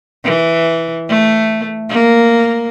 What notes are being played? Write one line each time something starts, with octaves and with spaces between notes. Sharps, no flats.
E3
A3
A#3